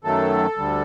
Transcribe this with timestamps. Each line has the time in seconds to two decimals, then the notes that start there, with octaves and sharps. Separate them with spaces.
0.04 F#2 D#3 F#3 A3 A4
0.57 D2 D3 G3